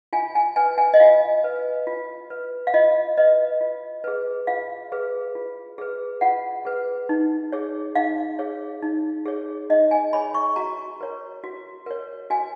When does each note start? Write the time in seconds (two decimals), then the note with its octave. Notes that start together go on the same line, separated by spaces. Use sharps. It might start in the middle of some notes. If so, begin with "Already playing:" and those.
0.13 F4 G#5
0.35 G#5
0.56 B4 G#5
0.78 G#5
0.94 D#5
1.00 F4 F5
1.44 B4
1.87 F4
2.30 B4
2.67 F5
2.74 F4 D#5
3.17 B4 D#5
3.61 F4
4.04 G#4 B4
4.47 F4 F5
4.92 G#4 B4
5.35 F4
5.78 G#4 B4
6.21 F4 F#5
6.65 G#4 B4
7.09 D#4
7.52 G#4 C#5
7.95 D#4 F5
8.39 G#4 C#5
8.83 D#4
9.26 G#4 C#5
9.70 D#4 D#5
9.91 G#5
10.13 G#4 C#5 B5
10.34 C#6
10.56 F#4 A#5
11.01 A#4 C#5
11.44 F#4
11.86 A#4 C#5
12.30 F#4 G#5